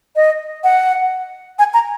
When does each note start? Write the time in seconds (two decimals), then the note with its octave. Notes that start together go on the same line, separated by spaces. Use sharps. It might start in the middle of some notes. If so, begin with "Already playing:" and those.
0.16 D#5
0.64 F#5
1.59 G#5
1.74 A#5